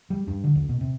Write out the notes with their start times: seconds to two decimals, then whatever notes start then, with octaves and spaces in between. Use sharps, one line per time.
0.10 G3
0.27 G2
0.44 D3
0.56 C#2
0.69 B2
0.81 C3